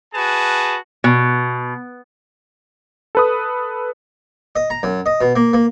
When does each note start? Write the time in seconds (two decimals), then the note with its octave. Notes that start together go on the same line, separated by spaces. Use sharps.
0.14 F#4 G#4 B4 A5
1.04 B2
3.15 A4 B4 D#6
4.56 D#5
4.70 A#5
4.83 F#2
5.06 D#5
5.21 B2
5.36 A#3
5.53 A#3